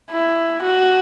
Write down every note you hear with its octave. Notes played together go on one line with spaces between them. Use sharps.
E4
F#4